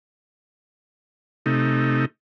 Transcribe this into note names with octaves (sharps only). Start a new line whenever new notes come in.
C3 A3 D#4